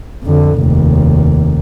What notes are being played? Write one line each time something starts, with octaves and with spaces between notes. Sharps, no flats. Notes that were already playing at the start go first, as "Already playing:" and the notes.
F2 D3
F1 D#2